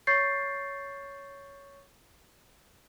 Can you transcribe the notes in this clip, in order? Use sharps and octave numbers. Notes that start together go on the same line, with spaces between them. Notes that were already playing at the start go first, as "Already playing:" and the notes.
C#5 C#6 G6 A6 C7